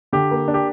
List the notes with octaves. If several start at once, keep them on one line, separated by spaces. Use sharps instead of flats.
D3 G4
A#3
D4
G4